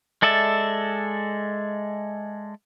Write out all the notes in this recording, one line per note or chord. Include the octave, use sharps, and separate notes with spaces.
G#3 A4 D5 E5